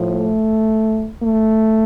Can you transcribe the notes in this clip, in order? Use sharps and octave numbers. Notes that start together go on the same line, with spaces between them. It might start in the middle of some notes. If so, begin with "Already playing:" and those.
Already playing: A2 F3
A3
A3